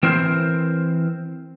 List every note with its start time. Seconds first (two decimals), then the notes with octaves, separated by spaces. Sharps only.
0.03 E3 C4 A#4 C5